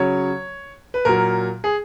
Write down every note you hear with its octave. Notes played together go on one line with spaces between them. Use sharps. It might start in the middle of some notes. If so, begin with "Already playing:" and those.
Already playing: C#3 F#3 C#5
B4
A#2 F#3 A#4
G#4